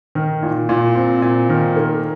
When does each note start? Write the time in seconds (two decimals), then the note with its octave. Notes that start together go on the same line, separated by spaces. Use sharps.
0.15 D#3
0.43 A#2
0.69 A#2
0.96 C4
1.22 A#2
1.49 D#3
1.76 A#3